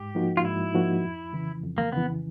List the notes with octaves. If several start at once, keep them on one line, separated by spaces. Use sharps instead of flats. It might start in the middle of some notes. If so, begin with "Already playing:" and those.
Already playing: G#2 G4
F3 A#3 D#4 F#4
F4
G#2 E4
F3 A#3 D#4 F#4
F2
C#3 E3
F2
A#3
C#3 E3 B3